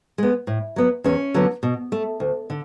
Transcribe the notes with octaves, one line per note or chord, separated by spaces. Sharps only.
G#3 B3
A2
F#3 B3
E2 C#4
D3 F#3 B3
B2
A3
D2
D3